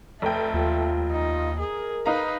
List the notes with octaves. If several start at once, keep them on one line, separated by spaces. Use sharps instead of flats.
F1 A3 G5
D#2 F4
D#4
G#4 A#4
D#4 B4 F5 A#5